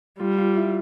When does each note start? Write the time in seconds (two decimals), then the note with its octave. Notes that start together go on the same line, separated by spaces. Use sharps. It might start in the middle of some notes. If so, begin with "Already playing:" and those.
0.19 G3 F4
0.38 F4
0.56 E4